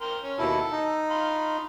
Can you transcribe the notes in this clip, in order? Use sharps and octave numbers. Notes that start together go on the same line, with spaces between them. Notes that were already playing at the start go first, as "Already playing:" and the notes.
A#4 G5 C6
C#4
D#2 B2 E4 A5 E6
D#4
F5 B5 C6